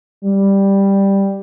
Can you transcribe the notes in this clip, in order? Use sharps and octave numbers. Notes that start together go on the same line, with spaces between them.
G3